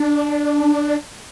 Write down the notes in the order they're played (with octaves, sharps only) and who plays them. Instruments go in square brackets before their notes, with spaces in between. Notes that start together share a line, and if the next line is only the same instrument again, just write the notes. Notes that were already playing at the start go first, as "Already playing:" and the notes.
Already playing: [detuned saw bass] D4